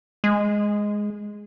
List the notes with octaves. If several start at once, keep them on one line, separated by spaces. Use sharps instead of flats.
G#3